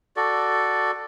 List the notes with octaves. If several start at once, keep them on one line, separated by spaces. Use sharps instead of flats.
F#4 A4 D5